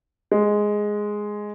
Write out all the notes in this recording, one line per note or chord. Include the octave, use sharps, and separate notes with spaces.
G#3